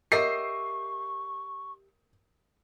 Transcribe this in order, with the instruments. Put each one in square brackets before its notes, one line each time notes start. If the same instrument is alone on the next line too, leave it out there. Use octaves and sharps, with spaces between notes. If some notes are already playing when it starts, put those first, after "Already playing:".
[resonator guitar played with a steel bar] G4 D#5 E5 [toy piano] A#4 C#5 F#5 [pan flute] C#6 [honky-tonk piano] C7